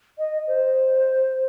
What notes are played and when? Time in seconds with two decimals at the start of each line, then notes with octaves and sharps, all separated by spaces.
0.19 D#5
0.47 C5